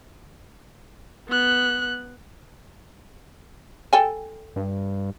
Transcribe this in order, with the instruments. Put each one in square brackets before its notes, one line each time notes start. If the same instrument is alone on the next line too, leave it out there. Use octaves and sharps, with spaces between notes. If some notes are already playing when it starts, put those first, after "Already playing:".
[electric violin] B3 F#6
[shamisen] A4 G5 G#5
[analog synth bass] G2